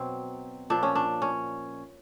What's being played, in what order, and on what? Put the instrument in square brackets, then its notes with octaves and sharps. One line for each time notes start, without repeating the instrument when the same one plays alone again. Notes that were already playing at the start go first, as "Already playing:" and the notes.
Already playing: [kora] B2 F#3 C4
A#2 F3 D4
C#4
D4
C#4